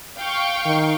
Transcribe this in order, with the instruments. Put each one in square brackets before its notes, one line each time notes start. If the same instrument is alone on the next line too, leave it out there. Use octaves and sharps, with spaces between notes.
[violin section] F5 G5 C#6
[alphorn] D#3